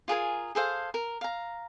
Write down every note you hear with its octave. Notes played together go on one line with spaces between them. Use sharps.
F4 G#4 A#4 G#5
G#4 A4 C5 F5
A#4
F5 A#5